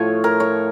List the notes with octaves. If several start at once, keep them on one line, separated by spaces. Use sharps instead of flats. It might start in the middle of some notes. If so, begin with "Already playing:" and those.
Already playing: A2 F3 A3 C#5
A#4
C#5